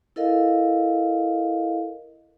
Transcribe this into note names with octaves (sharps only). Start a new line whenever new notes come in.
E4 A4 A#4 D#5 F5